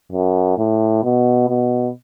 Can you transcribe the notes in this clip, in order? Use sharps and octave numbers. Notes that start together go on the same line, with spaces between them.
F#2
A2
B2
B2